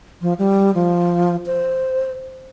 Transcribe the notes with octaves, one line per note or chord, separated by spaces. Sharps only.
F3
G3
F3
C5